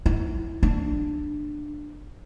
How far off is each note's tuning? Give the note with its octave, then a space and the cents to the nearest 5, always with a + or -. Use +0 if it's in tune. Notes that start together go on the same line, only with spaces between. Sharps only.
E4 -5
D4 +15